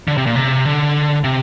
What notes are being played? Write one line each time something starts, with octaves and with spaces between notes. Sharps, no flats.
D3
C3
A#2
C3
D3
C3